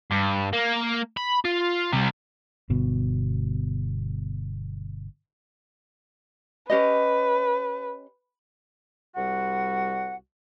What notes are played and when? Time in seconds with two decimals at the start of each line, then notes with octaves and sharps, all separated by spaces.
0.11 G2
0.53 A#3
1.17 B5
1.45 F4
1.92 C3 G3
2.70 G1 B2
6.70 C#4 G4 B4 D#5
9.16 C2 G3 F#4 F#5